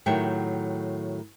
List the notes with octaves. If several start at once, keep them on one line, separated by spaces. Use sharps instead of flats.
A2 D#3 F#3 G4 E5 G5